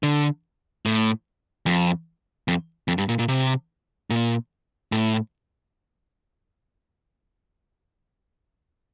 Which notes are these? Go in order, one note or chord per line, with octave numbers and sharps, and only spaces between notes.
D3
A2
F2
F2
F2
G2
A#2
A#2
C3
A#2
A2